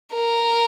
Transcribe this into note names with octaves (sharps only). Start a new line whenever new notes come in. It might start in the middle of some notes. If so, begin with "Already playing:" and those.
A#4